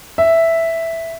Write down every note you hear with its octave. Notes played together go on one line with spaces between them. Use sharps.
E5